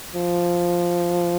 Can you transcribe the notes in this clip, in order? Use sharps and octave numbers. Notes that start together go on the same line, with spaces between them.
F3